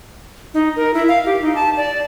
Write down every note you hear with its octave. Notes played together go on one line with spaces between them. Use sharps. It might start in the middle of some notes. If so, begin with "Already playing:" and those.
D#4
A#4
E4
F5
G4
D#4
A5
D5